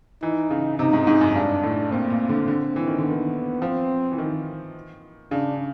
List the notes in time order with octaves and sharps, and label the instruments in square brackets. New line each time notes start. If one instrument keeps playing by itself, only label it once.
[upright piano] E3 [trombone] D#4
[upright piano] C#3
[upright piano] C3 [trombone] D#4
[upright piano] G#2
G#2
F#2
[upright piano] G2 [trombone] D4
[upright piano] A2
[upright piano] A#2 [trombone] C4
[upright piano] A#2
D3
D3
E3
D#3
D3
[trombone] B3
[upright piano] D#3
[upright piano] F3 [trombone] C4
[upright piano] E3
D#3
[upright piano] C#3 [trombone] D4